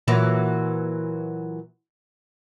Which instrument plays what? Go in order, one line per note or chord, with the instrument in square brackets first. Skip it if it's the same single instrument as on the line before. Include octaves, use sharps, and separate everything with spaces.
[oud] A#2 E3 F#3